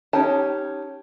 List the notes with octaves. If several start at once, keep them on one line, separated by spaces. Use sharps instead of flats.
C#4 D#4 G4 A5